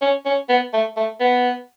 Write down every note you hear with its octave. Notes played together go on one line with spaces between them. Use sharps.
C#4
C#4
B3
A3
A3
B3